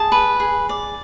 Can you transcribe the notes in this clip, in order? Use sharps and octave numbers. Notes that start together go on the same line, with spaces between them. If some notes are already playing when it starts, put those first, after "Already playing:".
Already playing: G#4 A5
B4
G#4
D5